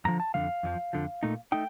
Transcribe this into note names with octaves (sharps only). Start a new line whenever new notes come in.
F2 D3 F3 A#5
A5
F2 D3 F3 F5
F2 D3 F3
F2 D3 F3
A#2 A3 D#4
A3 D#4 G5